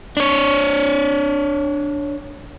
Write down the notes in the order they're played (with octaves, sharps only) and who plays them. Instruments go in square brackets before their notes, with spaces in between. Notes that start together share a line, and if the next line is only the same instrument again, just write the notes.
[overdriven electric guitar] D4 C#5